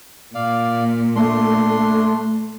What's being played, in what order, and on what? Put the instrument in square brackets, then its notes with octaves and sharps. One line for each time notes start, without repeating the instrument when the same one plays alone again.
[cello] A#2 [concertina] D5 F5
[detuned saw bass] A3 [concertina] D4 C6